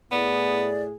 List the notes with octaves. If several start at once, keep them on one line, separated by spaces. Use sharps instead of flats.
A2 B3 G#4 D5